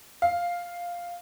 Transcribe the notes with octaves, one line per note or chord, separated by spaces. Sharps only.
F5